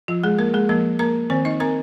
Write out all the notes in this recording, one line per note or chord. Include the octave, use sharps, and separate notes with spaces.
F3 F4
G#3 G#4
A#3 A#4
G#3 G#4
F3 A#3 A#4
A#3 A#4 A#5
D#3 C4 C5
D#4 D#5
C4 A#4 A#5